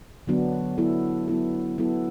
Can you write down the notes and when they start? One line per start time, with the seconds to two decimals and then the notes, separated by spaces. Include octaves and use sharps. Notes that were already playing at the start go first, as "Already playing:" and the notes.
0.27 D3 F#3 B3 D4
0.78 F#3 B3 E4 A4
1.28 F#3 B3 E4 A4
1.78 F#3 B3 E4 A4